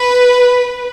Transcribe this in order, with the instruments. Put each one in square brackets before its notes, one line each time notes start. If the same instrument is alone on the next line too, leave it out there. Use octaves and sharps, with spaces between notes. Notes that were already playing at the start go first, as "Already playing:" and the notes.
Already playing: [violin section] B4